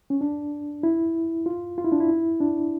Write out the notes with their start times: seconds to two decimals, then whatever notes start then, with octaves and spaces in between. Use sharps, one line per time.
0.10 C#4
0.21 D4
0.83 E4
1.46 F4
1.78 F4
1.85 E4
1.92 D4
2.00 E4
2.40 D4